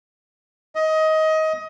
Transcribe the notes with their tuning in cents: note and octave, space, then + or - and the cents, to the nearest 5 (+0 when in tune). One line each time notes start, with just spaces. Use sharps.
D#5 +20